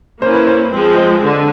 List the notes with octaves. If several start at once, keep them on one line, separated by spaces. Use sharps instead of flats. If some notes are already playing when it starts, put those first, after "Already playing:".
A#3 C#4 E4 C5
B4
C5
F3 G#3 C4
C5
D3